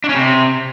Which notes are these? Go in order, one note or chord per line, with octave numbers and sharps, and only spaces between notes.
D4
C#4
C3